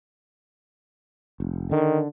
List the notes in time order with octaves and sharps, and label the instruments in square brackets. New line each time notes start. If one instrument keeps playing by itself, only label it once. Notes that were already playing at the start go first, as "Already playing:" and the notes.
[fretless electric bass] F1
[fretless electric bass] D3 [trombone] D#3